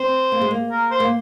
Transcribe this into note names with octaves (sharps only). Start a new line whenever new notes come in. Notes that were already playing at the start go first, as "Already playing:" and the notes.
Already playing: C4 C5
A#3
G#3
A#3
A#4
C5
A#3